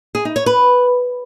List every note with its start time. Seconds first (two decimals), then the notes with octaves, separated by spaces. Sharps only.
0.15 G#4
0.25 D#4
0.36 C#5
0.46 B4